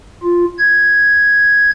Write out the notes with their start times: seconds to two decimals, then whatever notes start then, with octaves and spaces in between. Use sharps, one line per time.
0.24 F4
0.58 G#6